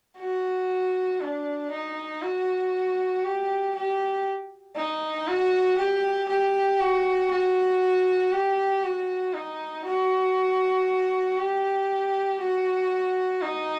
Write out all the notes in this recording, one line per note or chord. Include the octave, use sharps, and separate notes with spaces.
F#4
D4
D#4
F#4
G4
G4
D#4
F#4
G4
G4
F#4
F#4
G4
F#4
D#4
F#4
G4
F#4
D#4